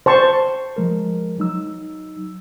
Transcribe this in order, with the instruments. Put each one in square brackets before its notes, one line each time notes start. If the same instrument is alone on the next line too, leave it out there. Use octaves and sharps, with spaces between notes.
[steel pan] C5 A5 C#6
[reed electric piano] F3 G#3 A#4
F#3 D#4 E6